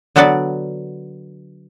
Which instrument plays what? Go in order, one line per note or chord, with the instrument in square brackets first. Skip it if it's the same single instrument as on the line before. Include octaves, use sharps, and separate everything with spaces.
[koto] D3 F#3 B3 F#4 D5